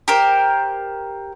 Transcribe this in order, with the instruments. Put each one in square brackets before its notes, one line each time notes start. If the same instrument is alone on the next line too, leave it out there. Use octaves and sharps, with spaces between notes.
[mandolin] G4 A#4 C5